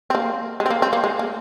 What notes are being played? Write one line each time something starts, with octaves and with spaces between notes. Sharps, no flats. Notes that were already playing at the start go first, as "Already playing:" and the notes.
C4
A#3
G#3
C4
A#3
C4
A#3
G#3
A#3